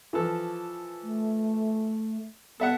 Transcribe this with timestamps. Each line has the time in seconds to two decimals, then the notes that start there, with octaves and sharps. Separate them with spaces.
0.13 E3 F3 A4
1.03 A3
2.60 B3 A4 E5 F#5